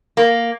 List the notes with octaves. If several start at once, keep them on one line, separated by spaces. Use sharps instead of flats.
A#3